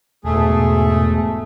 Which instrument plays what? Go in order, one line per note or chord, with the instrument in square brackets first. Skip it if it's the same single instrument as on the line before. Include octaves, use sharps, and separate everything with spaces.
[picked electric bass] E1 [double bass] G#2 B2 [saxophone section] A3 [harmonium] G#4